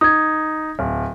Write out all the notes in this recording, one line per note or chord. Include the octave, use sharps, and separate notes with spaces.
D#4 D#6 G#6
D1